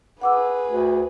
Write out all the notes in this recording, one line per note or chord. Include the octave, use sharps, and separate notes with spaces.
G#4 B4 F#5 D6 E6
D2